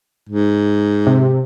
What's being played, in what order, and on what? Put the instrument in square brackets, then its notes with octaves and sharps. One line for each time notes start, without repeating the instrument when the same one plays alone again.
[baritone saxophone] G#2
[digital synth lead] C3